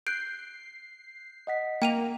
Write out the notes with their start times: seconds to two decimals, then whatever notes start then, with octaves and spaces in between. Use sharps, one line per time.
0.07 F#6 G6 C7 D7
1.47 D#5 F#5 B6
1.82 A#3 G5 D#7 F7